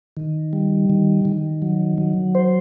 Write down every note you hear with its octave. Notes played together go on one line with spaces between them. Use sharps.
D#3
G3
D#3
D#3
F#3
F#3
C5